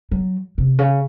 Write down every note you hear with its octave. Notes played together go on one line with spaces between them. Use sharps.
F#3
C3
C#3